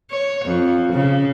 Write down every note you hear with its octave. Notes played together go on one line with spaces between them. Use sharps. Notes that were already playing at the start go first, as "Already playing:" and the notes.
C#5
F2
C#3